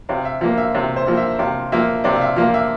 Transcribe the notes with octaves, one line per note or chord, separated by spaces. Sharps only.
C3 F5
E5
F3 A#3 F5
E5
C3
C5
F3 A#3
E5
C3 F5
F3 A#3 E5
C3 D5
F5
E5
F3 A#3 F5
E5